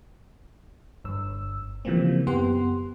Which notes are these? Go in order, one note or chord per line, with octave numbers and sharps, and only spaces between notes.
G1 G2 E6
C#3 E3 F3 G3 A#3 C4
F#2 B3 G4 F#5 C6